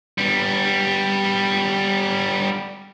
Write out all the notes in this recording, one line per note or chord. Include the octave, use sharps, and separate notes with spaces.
G3 B3